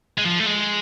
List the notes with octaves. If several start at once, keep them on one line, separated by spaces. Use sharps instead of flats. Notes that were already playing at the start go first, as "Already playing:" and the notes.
G#3
F3
A3
G#3